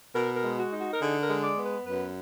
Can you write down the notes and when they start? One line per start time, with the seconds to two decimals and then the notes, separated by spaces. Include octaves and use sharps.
0.15 B2 A#4
0.36 A#4
0.44 G#3
0.58 F#4
0.72 D#4
0.79 F#4
0.94 A#4
1.01 D3 G#4
1.22 A#4
1.30 G#3
1.43 D5
1.58 B3
1.65 B4
1.86 F#2 B4